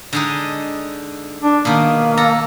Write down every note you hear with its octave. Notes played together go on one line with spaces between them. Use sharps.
D3 G#3 D#4
D4
B2 D#3 A#3
A4 A#5